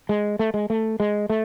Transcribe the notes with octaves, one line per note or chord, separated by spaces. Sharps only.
G#3
A3
G#3
A3
G#3
A3